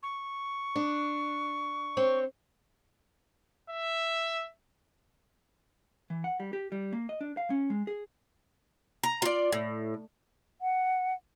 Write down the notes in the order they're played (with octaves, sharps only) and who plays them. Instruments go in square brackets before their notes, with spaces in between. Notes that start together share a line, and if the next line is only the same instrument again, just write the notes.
[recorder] C#6
[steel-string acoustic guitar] D4
C4 C#5
[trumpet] E5
[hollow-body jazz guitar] E3
F#5
G3
G4
G3
A#3
D#5
D4
F5
C#4
G#3
G#4
[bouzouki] A#5
F4 D5
A2
[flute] F#5